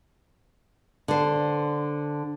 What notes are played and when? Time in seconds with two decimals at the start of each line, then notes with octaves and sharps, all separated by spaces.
1.08 D3 C5